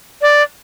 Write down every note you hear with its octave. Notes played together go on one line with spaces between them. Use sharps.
D5